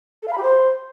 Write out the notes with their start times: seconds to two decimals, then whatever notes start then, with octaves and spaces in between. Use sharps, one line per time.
0.22 A4
0.28 F5
0.33 B5
0.38 G4
0.43 C5